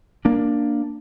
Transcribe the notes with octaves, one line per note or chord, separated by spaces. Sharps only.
A#3 D4